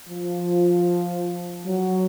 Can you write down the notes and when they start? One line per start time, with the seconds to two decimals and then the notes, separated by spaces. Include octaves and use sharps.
0.08 F3
1.66 F#3